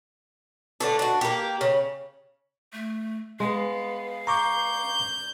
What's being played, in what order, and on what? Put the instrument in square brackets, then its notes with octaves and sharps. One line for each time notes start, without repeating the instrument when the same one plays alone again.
[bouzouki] D3 A3 D4
D4 F#4
A#3 G4
C#3
[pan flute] A3
[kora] G#3 [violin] B3 [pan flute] F5
[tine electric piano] A#5 C#6 D6 [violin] G6